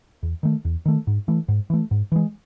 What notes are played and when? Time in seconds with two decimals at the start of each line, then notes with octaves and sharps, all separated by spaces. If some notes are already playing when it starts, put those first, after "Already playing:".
0.23 E2
0.43 D#3 A3
0.65 E2
0.86 D#3 A3
1.07 G#2
1.28 E3 A3
1.48 G#2
1.70 E3 A3
1.91 G#2
2.12 E3 G#3